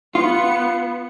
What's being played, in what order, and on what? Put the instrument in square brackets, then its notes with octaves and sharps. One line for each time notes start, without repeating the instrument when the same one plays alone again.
[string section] B3 C#7 [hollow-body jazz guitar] F4